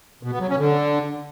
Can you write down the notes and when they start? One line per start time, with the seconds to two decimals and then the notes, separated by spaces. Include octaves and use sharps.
0.23 B2
0.32 B3
0.40 F#3
0.49 C#4
0.58 D3